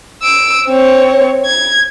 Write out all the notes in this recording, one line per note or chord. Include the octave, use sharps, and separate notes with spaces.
E6 D7
C4 C#5
G#6